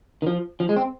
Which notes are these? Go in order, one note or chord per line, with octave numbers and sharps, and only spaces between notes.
D#3
F3
F3
G#3
C4